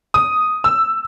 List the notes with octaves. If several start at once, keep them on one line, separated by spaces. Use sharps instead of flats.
D#6
E6